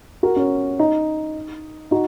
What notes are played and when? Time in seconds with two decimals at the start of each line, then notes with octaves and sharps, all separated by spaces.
0.23 F#4 A#4
0.36 C#4
0.79 D#4
1.91 D#4 F#4